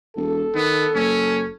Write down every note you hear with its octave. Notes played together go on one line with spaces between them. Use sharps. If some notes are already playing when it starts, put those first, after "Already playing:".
E1 A4
D#3 B3
F#1 C#4